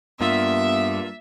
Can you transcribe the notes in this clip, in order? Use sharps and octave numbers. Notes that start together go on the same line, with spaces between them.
G2 A#3 B3 F4 E5